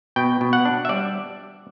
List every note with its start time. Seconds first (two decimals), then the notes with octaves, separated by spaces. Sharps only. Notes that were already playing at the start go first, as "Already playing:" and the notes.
0.16 B2 G5
0.41 B2
0.53 F#5
0.65 D4
0.85 E5
0.89 G3 D5